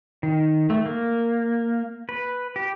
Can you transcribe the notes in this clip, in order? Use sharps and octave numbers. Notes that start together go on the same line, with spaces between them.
D#3
A3
A#3
B4
G4